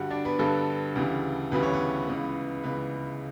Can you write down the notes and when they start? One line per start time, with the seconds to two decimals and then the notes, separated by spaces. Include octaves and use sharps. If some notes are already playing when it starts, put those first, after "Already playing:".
Already playing: G2 D3 G3 F#4 F#5
0.10 D4 D5
0.25 B3 B4
0.39 G2 D3 G3 A4
0.96 D2 C#3 E3 G3
1.52 D2 C#3 E3 G3 B4
1.63 C#5
1.73 B3 B4
2.08 C#2 C#3 E3
2.64 C#2 C#3 E3 B3 B4